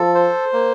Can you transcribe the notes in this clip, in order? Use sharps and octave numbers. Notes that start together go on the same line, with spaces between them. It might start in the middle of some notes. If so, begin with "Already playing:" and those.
Already playing: F3 A4
C5
A#3